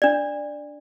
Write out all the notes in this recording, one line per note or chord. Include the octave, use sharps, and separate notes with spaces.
D4 D5